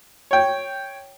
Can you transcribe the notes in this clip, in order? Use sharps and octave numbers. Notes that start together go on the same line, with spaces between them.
C#5 G5